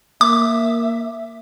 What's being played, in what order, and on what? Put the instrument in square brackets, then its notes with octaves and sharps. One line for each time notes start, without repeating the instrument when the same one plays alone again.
[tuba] A#3 [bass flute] E5 [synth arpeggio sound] D6